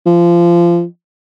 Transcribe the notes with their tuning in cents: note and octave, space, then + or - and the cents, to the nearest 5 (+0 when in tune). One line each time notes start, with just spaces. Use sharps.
F3 -25